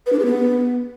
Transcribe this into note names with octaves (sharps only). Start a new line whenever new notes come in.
B4
D4
G#4
B3